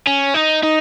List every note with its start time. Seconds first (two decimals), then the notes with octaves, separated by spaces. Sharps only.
0.07 C#4
0.34 D#4
0.63 D#4